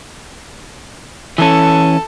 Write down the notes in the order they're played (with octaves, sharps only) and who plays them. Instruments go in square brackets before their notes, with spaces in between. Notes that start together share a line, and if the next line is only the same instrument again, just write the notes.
[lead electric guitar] E3 C#4 [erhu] A4